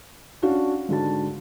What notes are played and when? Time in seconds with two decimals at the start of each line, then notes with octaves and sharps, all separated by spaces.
0.42 C#4 D4 F#4 F5
0.88 G#2 D3 F#4 A5